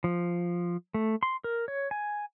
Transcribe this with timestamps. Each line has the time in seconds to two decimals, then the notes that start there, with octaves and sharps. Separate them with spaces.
0.04 F3
0.94 A3
1.23 C6
1.44 A#4
1.68 C#5
1.91 G#5